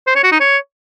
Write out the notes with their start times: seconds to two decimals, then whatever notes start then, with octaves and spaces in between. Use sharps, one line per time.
0.07 C5
0.15 C#5
0.24 F#4
0.32 D#4
0.40 C#5